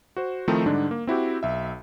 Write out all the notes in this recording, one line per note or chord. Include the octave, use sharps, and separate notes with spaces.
F#4 C5
D#3 F3 A3 C4 D#4 E4
G#2 D3 G3 D4 D#4
A#3
C4 E4 F#4 G4
B1 E5